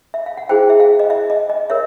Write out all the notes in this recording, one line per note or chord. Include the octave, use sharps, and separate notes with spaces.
E5
F5
F#5
E4 G#4 C5 G5
E5
F5
D#5
E5
D#5
D#5
A#4 C#5 E5